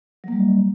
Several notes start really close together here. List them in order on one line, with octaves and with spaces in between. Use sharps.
F#3 A#3 G3